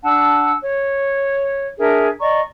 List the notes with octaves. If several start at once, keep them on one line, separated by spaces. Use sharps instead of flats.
D4 F#5 A5 E6
C#5
D4 G#4 A#4 E5
D5 D#5 A#5 C#6